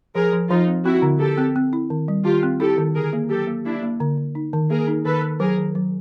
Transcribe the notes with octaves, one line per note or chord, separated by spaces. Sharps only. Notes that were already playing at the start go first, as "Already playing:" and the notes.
F3 G#4 A#4
F3
F3 D#4 F4
C4
C4 E4 F#4
D3
D3 G4 A4
C4
C4
E4
D#3
G3
D#3 F4 G4
C4
E4 G4 A4
D#3
D3 G#4 A#4
A#3
F#3 G4 A4
A#3
A#3 D4 E4
A#3
D3
D3
D#4
D#3
A#3 G#4 A#4
D#4
D#3 A4 B4
D#3
F#3 G#4 A#4
D#3
F#3